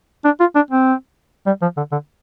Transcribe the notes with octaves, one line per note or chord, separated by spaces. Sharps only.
D4
F4
D4
C4
G3
F3
D3
D3